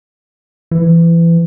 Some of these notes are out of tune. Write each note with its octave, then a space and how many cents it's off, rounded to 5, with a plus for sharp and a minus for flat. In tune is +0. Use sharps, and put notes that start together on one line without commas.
E3 +25